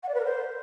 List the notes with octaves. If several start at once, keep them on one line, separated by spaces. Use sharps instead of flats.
F#5
D5
B4
A#4
C5